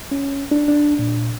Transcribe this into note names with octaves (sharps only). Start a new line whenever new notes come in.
C#4
D4
D4
A#2